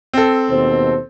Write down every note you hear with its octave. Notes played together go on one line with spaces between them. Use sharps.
C4 A4
D#2 B2 C5